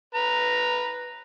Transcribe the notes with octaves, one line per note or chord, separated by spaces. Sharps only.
B4 A#5